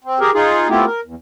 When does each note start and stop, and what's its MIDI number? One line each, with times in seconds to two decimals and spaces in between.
0.04 0.19 60
0.20 0.31 67
0.20 0.31 68
0.20 0.31 70
0.34 0.69 63
0.34 0.69 65
0.34 0.69 68
0.69 0.85 57
0.69 0.85 59
0.69 0.85 60
0.69 0.85 64
0.69 0.85 65
0.69 0.85 67
0.86 1.01 70
1.05 1.15 40